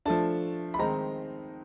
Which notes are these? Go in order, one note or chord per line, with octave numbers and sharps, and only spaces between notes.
F3 A3 D4 A5
B5
D#3 G#3 C4 D#4 A#5